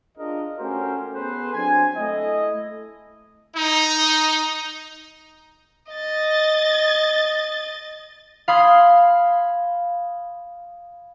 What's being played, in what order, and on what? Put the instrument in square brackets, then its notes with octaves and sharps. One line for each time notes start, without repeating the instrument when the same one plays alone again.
[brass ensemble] D4 F4 G#4 A#4 D#5
A3 C#4 F#4 G4 A#4 C5
B3 G#4 A4 B4 C5
F#3 C4 D4 G#5
A3 E4 D#5
[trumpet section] D#4
[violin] D#5 A6
[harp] F5 B5 C6 D#6 G#6